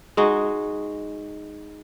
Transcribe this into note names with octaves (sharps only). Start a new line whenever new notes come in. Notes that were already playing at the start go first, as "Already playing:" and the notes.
G#3 D#4 F#4